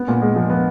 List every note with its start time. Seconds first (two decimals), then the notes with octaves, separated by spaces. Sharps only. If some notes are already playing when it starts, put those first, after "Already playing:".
Already playing: B3
0.08 A#2
0.22 G#3
0.36 F3
0.50 B3